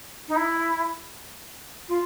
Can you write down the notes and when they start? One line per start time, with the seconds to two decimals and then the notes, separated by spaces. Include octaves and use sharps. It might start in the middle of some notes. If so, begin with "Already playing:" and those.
0.28 D#4
0.36 E4
1.88 F4